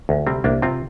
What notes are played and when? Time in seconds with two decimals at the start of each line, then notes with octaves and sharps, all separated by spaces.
0.09 D2
0.27 C3 G3 C4
0.44 C2 A#3 D4
0.62 C3 C4 F4